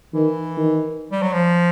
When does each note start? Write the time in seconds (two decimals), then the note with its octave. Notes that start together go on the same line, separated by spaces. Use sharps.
0.14 D#3 E3
0.57 D#3
1.12 G3
1.22 F#3
1.33 F3